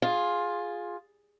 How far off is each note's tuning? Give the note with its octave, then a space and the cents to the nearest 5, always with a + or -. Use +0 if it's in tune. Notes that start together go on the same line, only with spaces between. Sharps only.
F4 +10 G#4 +0